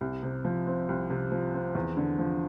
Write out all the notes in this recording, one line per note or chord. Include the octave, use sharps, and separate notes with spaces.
C2
C3
F3
C4
C2
C3
F3
C4
E2
D3
F3